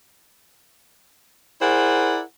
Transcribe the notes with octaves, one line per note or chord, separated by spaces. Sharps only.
E4 G#4 A#4 C5 D5 F#5